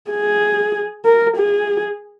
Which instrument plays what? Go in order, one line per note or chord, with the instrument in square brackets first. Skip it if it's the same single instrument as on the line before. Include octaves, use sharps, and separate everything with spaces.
[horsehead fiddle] G#4
A#4
G#4